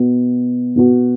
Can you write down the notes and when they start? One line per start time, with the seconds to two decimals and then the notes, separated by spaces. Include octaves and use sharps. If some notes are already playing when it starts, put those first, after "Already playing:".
Already playing: B2 B3 F#4
0.76 B2 B3 F#4